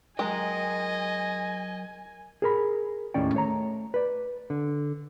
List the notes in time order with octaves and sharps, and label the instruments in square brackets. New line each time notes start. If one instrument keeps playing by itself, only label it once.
[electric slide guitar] F#3 A#4 G5 [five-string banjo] G#3 [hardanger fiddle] D#5 [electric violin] G#5
[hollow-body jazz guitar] G#4 A#4 B5
D#2 A2 C#4 D5 G5
A3 C#5 A#5
B4 D5
D3